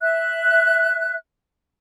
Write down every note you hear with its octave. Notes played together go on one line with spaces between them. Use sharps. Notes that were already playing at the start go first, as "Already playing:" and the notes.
E5 F#6